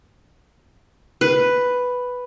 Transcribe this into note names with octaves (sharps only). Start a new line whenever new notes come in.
B4